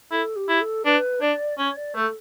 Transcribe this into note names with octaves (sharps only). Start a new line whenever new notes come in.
E4 A4
G4
E4
A4
D4 B4
D4 D5
C#4 C#5
D5
A3 A4